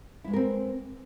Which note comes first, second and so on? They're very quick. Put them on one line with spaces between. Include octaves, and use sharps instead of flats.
E4 G#3 B3 A#4 C4